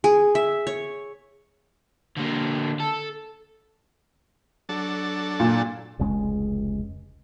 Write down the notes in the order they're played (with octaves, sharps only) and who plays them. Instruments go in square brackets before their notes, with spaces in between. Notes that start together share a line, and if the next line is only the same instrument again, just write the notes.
[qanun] G#4
E5
C#5
[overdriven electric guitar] D3 A#3
A4
[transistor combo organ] F#3 D4 A4
[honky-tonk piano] A#2
[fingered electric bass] F1 C#2 G#3 C#4